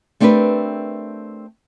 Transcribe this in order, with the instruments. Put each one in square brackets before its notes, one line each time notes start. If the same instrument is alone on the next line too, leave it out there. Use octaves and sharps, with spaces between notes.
[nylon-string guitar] A3 C4 D4 G4 A#4 B4